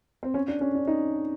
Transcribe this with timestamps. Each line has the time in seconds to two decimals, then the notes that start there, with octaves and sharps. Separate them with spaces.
0.23 C4
0.34 C#4
0.48 D4
0.61 C#4
0.75 D4
0.87 D#4